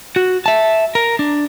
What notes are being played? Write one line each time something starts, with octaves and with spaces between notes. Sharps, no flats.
F#4
E5 A5
A#4
D4